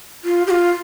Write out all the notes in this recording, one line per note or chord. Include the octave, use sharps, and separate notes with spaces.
F4
G4
F4